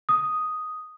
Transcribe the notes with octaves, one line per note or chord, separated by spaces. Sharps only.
D#6